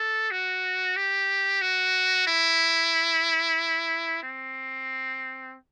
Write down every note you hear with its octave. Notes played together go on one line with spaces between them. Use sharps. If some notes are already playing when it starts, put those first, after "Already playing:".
Already playing: A4
F#4
G4
F#4
E4
C4